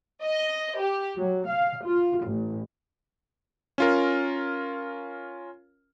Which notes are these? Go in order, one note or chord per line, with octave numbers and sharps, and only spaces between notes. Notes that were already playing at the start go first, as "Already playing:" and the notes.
D#5
G4
F#3
F5
F4
A1
C#4 F4 A#4